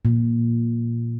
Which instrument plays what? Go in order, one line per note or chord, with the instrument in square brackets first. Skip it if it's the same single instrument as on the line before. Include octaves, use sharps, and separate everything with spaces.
[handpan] A#2